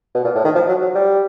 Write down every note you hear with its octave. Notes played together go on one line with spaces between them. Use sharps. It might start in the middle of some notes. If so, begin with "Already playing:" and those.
B2
A#2
A2
D#3
F3
F#3
F#3
G3